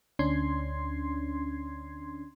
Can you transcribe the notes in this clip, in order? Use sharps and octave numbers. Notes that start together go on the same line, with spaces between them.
D2 C#4 D4 C6 G#6 C7